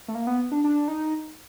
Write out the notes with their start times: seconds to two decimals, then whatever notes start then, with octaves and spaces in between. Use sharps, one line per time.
0.08 A3
0.15 A#3
0.27 B3
0.52 D4
0.64 D4
0.88 D#4